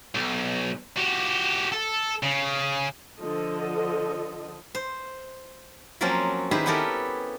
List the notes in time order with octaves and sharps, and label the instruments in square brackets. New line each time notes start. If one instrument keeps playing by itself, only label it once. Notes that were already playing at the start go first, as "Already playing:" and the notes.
[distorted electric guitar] B1
F#4 G4
A4
C#3
[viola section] D3 F3 A4 D#5
[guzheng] C5
F3 F#3 A#3 C4 C#4 F4
D#3 E4 G4 G#4 B4 C5
B3 C#4 E4 G4 A4 A#4